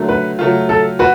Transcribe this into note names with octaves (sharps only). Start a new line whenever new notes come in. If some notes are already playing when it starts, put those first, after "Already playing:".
Already playing: D3 F#3 A3
B4
F#3 A3 F4
A4
F#4 B4